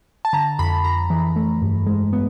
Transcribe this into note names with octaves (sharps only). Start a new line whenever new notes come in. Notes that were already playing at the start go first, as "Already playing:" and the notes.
A5
D3 A#5
F2 B5
F2 A#5
E3
A3
G2
G#3
B3